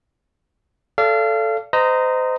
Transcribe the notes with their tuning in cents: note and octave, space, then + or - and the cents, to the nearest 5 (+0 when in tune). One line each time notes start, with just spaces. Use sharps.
A4 +0 D5 -25 F5 -30
C5 -30 D#5 +0 A#5 -10